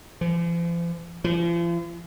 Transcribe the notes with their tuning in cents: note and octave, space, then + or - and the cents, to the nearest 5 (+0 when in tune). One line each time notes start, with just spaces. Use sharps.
F3 -45
F3 -40